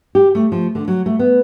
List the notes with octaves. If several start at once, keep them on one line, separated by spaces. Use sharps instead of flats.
G4
A3
F3
D3
F#3
A3
B3